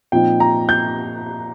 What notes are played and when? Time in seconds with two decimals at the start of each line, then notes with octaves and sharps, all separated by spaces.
0.12 A#2 F3 C4 D#4 G5
0.40 A#5
0.69 G6